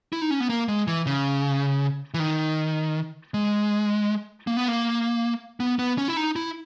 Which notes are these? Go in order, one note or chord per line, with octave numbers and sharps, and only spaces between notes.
E4
D#4
C#4
B3
A#3
G#3
E3
C#3
E3
D#3
G#3
A#3
B3
A#3
B3
B3
C#4
E4
D#4
E4